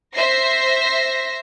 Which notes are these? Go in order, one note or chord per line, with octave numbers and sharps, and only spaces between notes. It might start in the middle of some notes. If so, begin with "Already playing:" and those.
C5 E5 A#6 C7